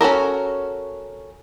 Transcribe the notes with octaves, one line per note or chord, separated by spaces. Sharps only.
C#4 F#4 A4 A#4